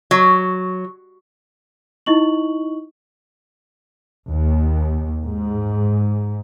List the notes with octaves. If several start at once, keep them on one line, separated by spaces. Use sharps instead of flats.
F#3
D#4 E4 D#5 C#6 F#7
D#2
G#2